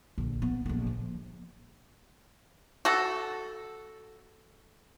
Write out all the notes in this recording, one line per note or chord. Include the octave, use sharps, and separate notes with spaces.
A#1 D3
B3
A#1 A3
F3
F#4 A4